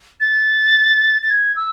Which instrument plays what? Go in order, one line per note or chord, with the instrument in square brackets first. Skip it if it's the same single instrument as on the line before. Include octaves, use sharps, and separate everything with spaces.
[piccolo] A6
A6
G#6
E6